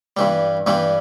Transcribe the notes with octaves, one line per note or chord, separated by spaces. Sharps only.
G2 E3 G3
G2 E3 G3